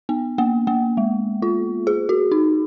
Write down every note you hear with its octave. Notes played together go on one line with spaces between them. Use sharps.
B3
A#3
A#3
G#3
F4
G#4
F#4
D#4